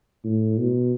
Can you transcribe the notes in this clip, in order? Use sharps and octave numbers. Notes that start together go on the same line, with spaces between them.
A2
B2